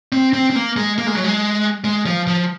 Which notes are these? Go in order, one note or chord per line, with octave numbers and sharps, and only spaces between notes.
C4
C4
C4
A#3
G#3
A#3
G#3
F#3
G#3
G#3
F3
F3